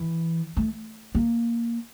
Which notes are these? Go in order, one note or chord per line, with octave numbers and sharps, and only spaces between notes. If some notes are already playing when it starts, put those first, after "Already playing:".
Already playing: E3
A3
A#3